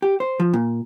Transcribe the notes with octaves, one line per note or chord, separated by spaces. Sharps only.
G4
C5
F3
A#2